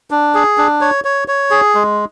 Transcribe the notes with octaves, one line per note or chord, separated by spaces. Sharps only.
D4
G#4
D4
C#5
C#5
C#5
G#4
G#3